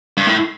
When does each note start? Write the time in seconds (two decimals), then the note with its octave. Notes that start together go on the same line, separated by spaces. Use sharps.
0.17 G2
0.26 A2